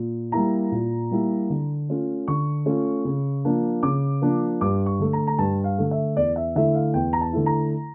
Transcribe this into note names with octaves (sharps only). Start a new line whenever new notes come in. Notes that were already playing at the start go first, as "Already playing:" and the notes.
Already playing: A#2
G3 A#3 E4 A#5
A#2
G3 A#3 E4
D3
A3 C#4 F4
D3 C#6
A3 C#4 F4
C#3
F3 A#3 D4
C#3 D6
F3 A#3 D4
G2 D6
C#6
D3 A3
A#5
A#5
G2 A5
F5
D3 A3
E5
E2 D5
E5
D3 A3 E4 E5
F5
E2 G5
A#5
A5
D3 A3 E4
A#5